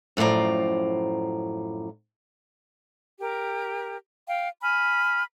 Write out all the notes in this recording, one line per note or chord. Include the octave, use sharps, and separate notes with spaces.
F#2 A2 F3 D5 A#5
G4 A#4
F5 G5
G#5 B5 F6